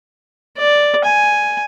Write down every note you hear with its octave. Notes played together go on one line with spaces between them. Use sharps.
D5
G#5